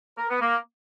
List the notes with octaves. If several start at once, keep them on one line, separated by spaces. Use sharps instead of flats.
A#4
B3
A#3